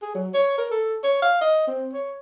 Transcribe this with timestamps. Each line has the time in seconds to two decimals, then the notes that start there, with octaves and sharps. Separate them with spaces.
0.02 G#4
0.15 F#3
0.34 C#5
0.58 A#4
0.71 A4
1.04 C#5
1.22 F5
1.41 D#5
1.67 C4
1.93 C#5